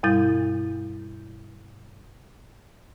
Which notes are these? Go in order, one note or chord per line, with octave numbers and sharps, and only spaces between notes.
G2 B2 G3 E4 G6 A6